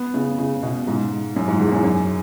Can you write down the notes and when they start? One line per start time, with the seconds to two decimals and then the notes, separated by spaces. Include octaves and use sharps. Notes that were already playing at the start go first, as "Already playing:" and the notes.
Already playing: B3
0.14 C#3
0.38 C#3
0.63 B2
0.87 G#2
1.36 F#2
1.48 G#2
1.60 E2
1.72 F#2
1.84 F#2